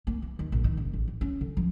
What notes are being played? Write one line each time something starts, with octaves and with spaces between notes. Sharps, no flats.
A#3
E3
D#2
A#1
D#3
F#1
A1
E3
C#4
D3
F3